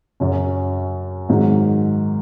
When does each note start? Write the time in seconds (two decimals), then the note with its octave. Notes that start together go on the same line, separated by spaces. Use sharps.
0.20 F#2 C#3 F#3 C#4
1.29 G#2 D#3 F#3